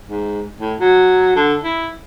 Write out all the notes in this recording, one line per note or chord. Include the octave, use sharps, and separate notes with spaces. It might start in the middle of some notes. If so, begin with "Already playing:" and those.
G#2
A2
F#3
D3
E4